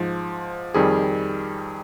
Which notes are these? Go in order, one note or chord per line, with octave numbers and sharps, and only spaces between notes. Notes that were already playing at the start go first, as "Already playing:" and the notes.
Already playing: G#2 F3
F2 D#3 G3 G#4